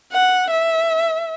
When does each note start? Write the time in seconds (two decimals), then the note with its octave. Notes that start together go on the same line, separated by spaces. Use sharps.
0.12 F#5
0.51 E5